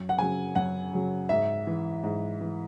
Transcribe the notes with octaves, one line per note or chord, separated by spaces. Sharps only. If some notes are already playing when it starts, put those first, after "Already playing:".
Already playing: F#2
F#5
C#3 F#3 G#5
F#2 F#5
C#3 F#3
G#2 E5
E3
G#2
E3